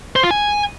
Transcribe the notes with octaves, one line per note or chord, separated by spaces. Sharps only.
C5
F4
G#5